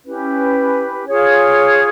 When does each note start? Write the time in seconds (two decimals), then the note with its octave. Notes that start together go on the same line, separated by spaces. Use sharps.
0.04 C#4 E4 G4 B4
1.07 F4 G#4 C#5